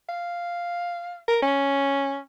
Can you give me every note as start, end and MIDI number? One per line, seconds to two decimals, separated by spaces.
0.09 1.17 77
1.28 1.38 70
1.42 2.19 61